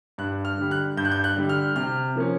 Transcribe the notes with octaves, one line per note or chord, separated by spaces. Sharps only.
G2 F#6
F6
D3 G3
F#6
G2 G6
F#6
G6
F#6
D3 G3
F6
C3 F6
F3 A#3 C#4